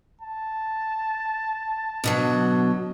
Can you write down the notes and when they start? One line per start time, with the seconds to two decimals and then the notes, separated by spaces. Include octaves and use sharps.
0.21 A5
2.04 B2 D3 F#3